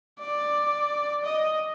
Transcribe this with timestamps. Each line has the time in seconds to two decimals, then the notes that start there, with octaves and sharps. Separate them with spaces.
0.19 D5
1.25 D#5